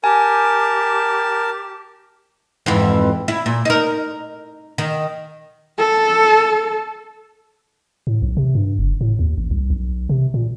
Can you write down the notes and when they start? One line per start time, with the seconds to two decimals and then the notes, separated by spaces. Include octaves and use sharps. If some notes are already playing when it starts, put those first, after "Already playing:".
0.04 G4 A#4 G#5 A5
2.66 F2 G#2 E3
3.28 E4
3.46 A#2
3.65 D#4 A#4
4.78 D#3
5.78 A4
8.07 A2
8.22 B1
8.37 C3
8.55 G2
8.79 F#1
9.01 A2
9.19 D#2
9.38 A1
9.51 C2
9.70 B1
10.09 C3
10.34 A#2